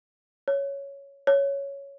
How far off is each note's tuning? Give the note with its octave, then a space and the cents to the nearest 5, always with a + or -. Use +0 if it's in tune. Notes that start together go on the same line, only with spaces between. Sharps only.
C#5 +5
C#5 +5